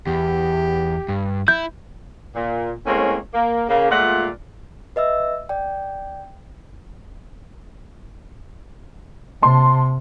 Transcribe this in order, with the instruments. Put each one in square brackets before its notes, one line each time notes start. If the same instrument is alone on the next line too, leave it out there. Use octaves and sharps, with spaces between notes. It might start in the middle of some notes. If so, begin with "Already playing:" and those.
[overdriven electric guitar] E2 [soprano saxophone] G4
[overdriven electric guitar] G2
[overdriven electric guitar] E4 [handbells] G6
[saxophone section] A#2
A2 G#3 A#3 C4 C#4
A#3
C#3 A#3
A#2 G#3 A3 F4 D5 F#5
[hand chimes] B4 D#5 E5 E6
D5 G5
[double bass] C3 [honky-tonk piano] A5 C6